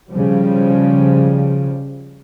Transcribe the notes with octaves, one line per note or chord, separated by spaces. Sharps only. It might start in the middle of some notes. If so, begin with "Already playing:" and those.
C#3 F3 G3